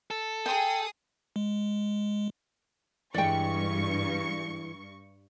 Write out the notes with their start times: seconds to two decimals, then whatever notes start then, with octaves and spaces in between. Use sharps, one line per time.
0.11 A4
0.46 G#4 G5 D#6
1.36 G#3
3.14 G2 E3 G#3 D5 G5 C#6